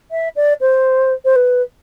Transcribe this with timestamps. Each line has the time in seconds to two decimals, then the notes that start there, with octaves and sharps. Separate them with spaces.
0.11 E5
0.36 D5
0.61 C5
1.25 C5
1.36 B4